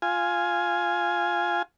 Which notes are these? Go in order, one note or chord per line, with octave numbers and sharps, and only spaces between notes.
F4 G#5